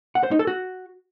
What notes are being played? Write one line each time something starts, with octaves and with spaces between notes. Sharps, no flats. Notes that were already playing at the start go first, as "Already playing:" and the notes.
F#5
C5
D#4
A4
F#4